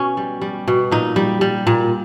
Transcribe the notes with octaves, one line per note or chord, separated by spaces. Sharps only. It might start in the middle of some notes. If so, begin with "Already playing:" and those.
Already playing: B2 C#4
G3
G3
B2
A#2 D#4
G3
G3
A#2